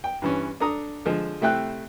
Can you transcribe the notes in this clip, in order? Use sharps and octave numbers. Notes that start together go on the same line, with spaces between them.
G5
G2 E3 C#4
D4 A4 A#5 D#6
D3 F3 G#3
C3 A3 C4 E4 G5 F#6